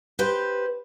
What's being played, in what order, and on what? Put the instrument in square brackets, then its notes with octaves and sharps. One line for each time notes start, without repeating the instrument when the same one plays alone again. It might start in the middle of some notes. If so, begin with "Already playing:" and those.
[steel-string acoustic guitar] G4 B4 C5